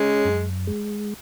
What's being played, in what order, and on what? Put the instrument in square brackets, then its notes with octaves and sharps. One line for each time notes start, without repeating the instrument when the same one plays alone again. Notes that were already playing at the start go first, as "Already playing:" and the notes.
Already playing: [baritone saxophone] G#3 [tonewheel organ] C#4
[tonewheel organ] F#2
G#3